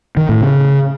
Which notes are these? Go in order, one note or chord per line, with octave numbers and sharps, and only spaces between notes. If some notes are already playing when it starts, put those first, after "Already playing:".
D#3
A2
C#3